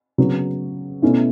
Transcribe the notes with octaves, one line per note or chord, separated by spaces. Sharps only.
C#3 F#3 B3
B2 A3 C#4 E4